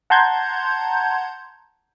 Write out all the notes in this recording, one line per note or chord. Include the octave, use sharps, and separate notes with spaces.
F#5 A5 A#5 C6 G6 G#6